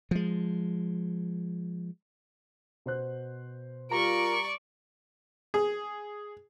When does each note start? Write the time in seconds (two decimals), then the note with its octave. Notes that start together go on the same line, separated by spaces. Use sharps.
0.11 F3 G#3
2.86 B2 C5 F#6
3.92 G3 F4 A#4 D5 A#5 C#6
5.54 G#4